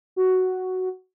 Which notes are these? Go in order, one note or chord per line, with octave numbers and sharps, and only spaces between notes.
F#4